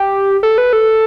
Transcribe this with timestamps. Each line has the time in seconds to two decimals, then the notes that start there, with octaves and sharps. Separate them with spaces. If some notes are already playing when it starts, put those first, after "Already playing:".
Already playing: G4
0.43 A4
0.58 B4
0.73 A4